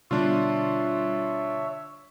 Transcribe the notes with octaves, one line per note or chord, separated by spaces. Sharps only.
B2 D3 G3 D4 F4 C#5 E5